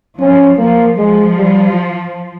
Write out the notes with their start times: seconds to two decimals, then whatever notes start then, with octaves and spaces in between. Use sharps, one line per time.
0.20 F3 C#4
0.58 F3 A#3
0.97 F3 G#3
1.37 G3